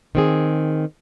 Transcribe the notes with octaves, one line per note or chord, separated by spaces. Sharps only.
D#3 C4 G#4